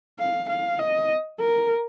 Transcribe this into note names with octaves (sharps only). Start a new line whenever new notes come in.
F5
F5
D#5
A#4